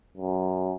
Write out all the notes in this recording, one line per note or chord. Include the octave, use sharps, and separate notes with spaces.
F#2